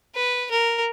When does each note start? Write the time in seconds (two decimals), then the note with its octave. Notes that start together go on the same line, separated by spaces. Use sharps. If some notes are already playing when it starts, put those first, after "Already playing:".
0.15 B4
0.51 A#4